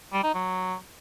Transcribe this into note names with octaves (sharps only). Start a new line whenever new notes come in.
G3
D#4
F#3